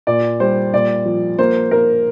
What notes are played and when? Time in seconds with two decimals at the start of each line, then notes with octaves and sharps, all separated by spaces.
0.07 A#2 D5
0.40 G3 C5
0.74 A#2 D5
1.05 F3
1.39 A#3 C5
1.71 A#3 A#4